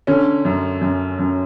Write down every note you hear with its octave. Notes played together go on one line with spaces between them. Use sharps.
D3 C#4
F#2
F#2
F#2